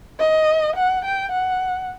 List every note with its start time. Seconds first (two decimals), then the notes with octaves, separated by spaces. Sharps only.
0.20 D#5
0.76 F#5
1.05 G5
1.32 F#5